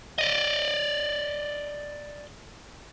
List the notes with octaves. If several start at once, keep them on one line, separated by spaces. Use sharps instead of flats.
D5 D#5